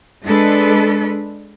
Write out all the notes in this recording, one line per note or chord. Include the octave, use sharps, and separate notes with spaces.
G#3 D4 A4 B4